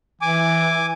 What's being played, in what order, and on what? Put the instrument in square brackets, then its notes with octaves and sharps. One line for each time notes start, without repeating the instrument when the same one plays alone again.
[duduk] E3 [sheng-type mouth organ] G#5 D6